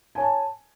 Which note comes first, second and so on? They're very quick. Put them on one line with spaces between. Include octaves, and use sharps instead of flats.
G#5 C#5 A5